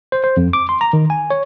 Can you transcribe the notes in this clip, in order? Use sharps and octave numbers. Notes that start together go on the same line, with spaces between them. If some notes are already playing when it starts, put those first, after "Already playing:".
C5
C5
F2
D6
C6
A#5
D#3
G#5
C#5